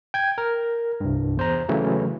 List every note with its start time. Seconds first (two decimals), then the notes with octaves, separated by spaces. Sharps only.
0.14 G5 G#6
0.38 A#4
1.00 C2 G2
1.37 E2 C5 A#5
1.69 C#3 E3 F#3 A3